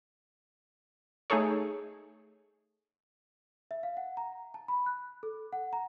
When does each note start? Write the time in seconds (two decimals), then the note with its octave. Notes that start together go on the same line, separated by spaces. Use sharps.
1.30 A3 D#4 G#4 A4 C#5
3.71 E5
3.83 F5
3.97 F#5
4.17 A#5
4.54 A5
4.68 B5
4.86 F#6
5.23 A4
5.53 F#5
5.73 A#5